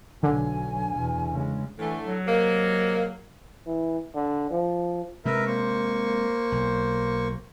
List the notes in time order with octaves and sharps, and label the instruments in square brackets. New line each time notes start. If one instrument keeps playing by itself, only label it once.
[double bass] B1 F#3 [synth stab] D3 [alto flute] G#5
[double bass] E2 B2
C#3 G#3
[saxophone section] A2 D3 A3 [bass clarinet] E3
[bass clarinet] F#3
[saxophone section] C3 G#3 A#3
[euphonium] E3
D3
F3
[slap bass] C3 G#3 [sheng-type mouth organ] A#4 B4 E5
[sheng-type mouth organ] A#3 C5 C#6
[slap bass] B1